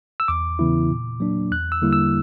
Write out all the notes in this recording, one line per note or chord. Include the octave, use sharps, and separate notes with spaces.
E6
E2 D6
C#3 E3 B3 E4
A#2
F#3 A#3 D4
E2 F#6
E6
D3 G3 A#3 E4
E6